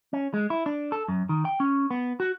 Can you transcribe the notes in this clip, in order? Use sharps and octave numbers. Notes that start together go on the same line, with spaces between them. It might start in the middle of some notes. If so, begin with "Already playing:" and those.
C#4
G#3
E4
D4
A4
F#2
D#3
G5
C#4
B3
F#4